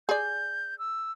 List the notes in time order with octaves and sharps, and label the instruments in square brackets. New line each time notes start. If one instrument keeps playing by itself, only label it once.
[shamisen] G#4 D5 [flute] G6
[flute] E6